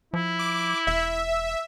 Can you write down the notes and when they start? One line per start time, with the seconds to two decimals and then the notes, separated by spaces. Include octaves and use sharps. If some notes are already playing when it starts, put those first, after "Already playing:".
0.14 F3 E4
0.39 D6
0.87 E1 E5